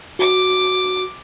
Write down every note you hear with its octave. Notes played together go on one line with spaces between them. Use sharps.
F#4 D6